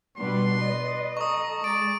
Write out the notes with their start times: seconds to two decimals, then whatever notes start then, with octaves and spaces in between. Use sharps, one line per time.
0.17 B2 G3 D4 B4 C6
0.62 B4 D5 D#5
1.17 A4 A#5 C#6 D#6
1.64 G#3 D5 D7